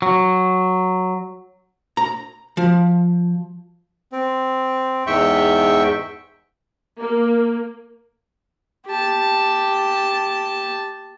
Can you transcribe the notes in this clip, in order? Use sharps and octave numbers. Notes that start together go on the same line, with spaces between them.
F#3
A#5
F3
C4
E2 G#2 E5 G5 C#6 G6
A#3
G4 A5